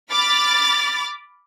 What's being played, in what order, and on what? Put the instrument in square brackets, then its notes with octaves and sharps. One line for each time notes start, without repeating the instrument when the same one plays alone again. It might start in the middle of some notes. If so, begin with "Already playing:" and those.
[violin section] B5 D6 F6 A6